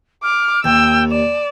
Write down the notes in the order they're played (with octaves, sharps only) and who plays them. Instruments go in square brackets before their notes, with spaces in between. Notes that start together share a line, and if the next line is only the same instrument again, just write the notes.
[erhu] D6 [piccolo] F6
[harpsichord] D#2 [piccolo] G5 [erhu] E6
[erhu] D5 [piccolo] E7